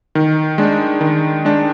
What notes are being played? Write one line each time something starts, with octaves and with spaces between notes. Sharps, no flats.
D#3
G#3 D4
D#3
G#3 D4